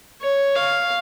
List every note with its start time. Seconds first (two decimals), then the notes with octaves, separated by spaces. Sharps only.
0.21 C#5
0.55 F5